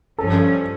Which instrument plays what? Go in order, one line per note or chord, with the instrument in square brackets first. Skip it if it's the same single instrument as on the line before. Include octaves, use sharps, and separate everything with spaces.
[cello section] G2 F3 C#4 [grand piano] A4